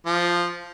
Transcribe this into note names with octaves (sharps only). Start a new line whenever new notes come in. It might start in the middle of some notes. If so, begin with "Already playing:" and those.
F3